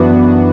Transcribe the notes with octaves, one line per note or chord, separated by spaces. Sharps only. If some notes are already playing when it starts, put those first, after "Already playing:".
Already playing: F#2 E3 B3 D4 F#4